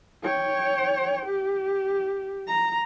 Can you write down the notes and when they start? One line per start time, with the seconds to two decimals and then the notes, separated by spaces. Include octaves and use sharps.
0.24 C#5 G5
1.26 G4
2.48 A#5